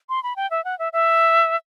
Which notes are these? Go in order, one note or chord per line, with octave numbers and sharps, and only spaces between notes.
C6
B5
G5
E5
F#5
E5
E5